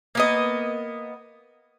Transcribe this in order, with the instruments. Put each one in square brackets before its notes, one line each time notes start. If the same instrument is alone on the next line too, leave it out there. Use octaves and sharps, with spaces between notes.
[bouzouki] A#3 B3 D#5